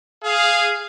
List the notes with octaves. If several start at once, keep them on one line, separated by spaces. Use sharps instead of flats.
G#4 F5